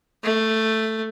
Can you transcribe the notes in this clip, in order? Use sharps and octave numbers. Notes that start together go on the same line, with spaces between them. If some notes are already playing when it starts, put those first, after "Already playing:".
A3